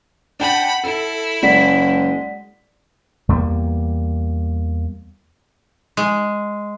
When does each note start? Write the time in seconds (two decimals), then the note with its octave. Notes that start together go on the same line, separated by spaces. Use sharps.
0.40 D4 F#5 G5 A5 B5
0.84 E4 A4
1.43 F#1 G#3 D5 F#5 B6
3.29 E2 G3 G#3 A#3
5.97 G#3